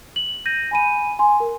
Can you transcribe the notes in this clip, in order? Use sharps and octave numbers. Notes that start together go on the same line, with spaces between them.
F#7
G6 A#6 D#7
G#5 B5 D#7
G#5 C6
A#4